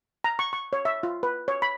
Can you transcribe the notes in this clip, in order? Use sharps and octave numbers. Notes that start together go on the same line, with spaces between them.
A#5
C#6
C#6
C#5
E5
F4
B4
C#5
B5